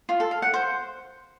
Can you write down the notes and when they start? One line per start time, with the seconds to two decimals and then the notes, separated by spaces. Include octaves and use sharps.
0.09 F4
0.20 A4
0.31 F5
0.42 F#5
0.54 C5